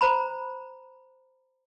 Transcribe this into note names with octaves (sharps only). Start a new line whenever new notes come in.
C5 A#5 B5